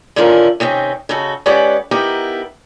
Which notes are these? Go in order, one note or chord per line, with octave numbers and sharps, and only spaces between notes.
D3 D#3 C#4 E4 F4 A#4
C3 D#3 C4 C#4
C#3 D#4 F#4 A4
G#3 C#4 G4 B4 D5 F#5
B3 D#4 E4 G4 A#4